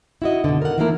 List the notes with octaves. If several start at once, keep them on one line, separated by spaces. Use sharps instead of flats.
E4 F#4 D#5
B2 D3
A#4 F#5
E3 F3 A3 A#3 E4 A#4